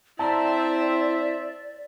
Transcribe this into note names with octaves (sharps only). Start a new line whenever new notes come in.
C4 E4 D5 E5 A5 A#5 E6